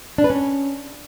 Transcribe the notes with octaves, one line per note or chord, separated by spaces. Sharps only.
D4
B4
C#4